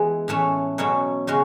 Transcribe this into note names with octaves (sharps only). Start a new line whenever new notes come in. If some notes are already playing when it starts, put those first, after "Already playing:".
Already playing: E3 G#3 B3
A2 E3 A3 C#4
B2 F#3 A3 C#4 E4
C#3 G#3 C#4 F#4